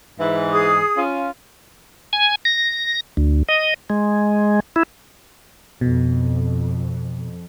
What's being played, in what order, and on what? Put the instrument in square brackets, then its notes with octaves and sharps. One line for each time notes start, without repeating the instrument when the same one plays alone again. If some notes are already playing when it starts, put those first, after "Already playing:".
[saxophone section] G#2 E3
[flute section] G#4 D#6
[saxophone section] C#4 F4
[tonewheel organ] G#5
A#6
D2
D#5
G#3
E4
[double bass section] F2 [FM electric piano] B2